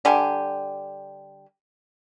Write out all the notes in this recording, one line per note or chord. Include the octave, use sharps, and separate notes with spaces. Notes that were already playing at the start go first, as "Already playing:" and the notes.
D3 G3 G4 G#5